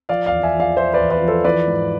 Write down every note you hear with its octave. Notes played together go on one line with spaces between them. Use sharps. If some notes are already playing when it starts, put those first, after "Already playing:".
F3 D5 F5
E2 D5 F5
E5 G#5
F3 D5 F5
F3 C5 E5
B4 D5
E2
B4 D5
F3
A4 C5
E3 B4 D5
G#2